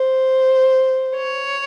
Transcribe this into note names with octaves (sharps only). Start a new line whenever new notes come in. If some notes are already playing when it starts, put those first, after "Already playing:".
Already playing: C5
C#5